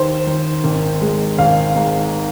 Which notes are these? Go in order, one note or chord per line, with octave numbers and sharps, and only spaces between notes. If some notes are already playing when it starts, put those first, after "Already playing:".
Already playing: D#2 D#3 C5
D#3
G#1
G#3
G#1 F5
G#2